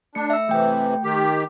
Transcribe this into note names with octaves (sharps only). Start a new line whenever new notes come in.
A3 D4 C#7
E5 E6
C3 E3 A3 G5
D#3 G4